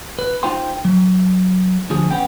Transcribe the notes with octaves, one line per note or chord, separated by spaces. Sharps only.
B4
D#4 F4 C5 G5 C6
F#3
D2 F3 G#4
B3 C#4 G5